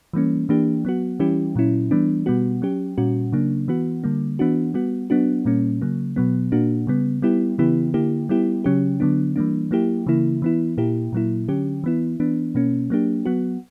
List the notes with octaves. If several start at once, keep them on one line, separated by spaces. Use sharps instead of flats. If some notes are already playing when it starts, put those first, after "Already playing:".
E3 G3 A#3 C#4
E3 A#3 D4 G4
F#3 B3 F#4
E3 G3 C#4 E4 G4
A#2 F#3 C#4 E4
E3 G3 B3 D4
B2 G3 B3 F#4
F#3 C#4 G4
A#2 G3 C#4 F#4
C#3 F#3 A#3 D4
E3 B3 F#4
D3 G3 A#3
E3 B3 D4 F#4
G3 B3 F#4
F#3 B3 D4 F#4
A#2 G3 A#3 C#4
C#3 F#3 A#3
B2 F#3 B3
A#2 A#3 D4 F#4
C#3 G3 B3
G3 B3 E4 G4
C#3 E3 B3 E4 G4
D3 A#3 E4 G4
G3 B3 E4 G4
C#3 F#3 C#4 G4
D3 F#3 B3 D4
E3 G3 A#3 D4
F#3 A#3 E4 G4
C#3 E3 A#3 E4
E3 B3 E4
A#2 A#3 E4 G4
A#2 F#3 A#3 E4
D3 F#3 C#4 G4
E3 B3 E4
E3 B3 D4
B2 A#3 C#4
F#3 A#3 D4 G4
F#3 B3 F#4